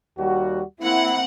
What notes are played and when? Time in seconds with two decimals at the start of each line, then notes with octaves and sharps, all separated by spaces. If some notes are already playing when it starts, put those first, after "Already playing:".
0.19 D#2 G3 F#4
0.81 A#3 C4 E4 F#5